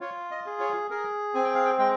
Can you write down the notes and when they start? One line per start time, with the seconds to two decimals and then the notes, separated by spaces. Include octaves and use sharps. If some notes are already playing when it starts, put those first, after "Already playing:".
0.01 F4 C#5
0.31 D#5
0.46 G#4
0.60 C#5
0.90 G#4 A#4
1.34 C4 G#5
1.44 G5
1.54 F5
1.65 G5
1.78 G#3 G5